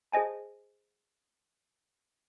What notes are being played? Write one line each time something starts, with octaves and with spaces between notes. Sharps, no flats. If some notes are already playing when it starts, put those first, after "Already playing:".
G#4 C5 D#5 G#5 A5